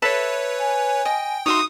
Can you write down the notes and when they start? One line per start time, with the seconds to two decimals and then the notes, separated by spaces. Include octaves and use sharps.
0.02 A4 B4 C#5 E5 B5
0.60 G#5
1.05 D#5 G5
1.46 D#4 F#4 C#5 E5 C6 D#6